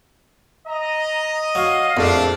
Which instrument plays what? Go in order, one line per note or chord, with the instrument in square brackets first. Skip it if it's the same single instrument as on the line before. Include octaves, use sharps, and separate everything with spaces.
[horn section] D#5 [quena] A#5
[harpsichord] F#3 [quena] F5
[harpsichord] A#1 F2 [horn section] F3 A3 D4